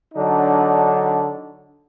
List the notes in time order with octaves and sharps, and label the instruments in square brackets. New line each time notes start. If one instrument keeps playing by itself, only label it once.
[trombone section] D3 F#3 D4 D#4